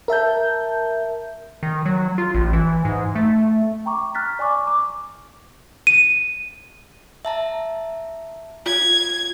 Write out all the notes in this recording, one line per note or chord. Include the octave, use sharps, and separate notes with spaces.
A#4 E5 A5 G6
D#3
F#3
F4
A1
E3
G#2
A3
G5 A#5 C#6 D6
A#5 F6 F#6 A6 B6
D5 G#5 A#5 C#6 D6
D6
D#7
E5 A5 A#5
F4 G#6